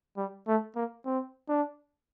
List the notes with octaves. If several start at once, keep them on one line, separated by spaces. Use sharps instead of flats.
G3
A3
A#3
C4
D4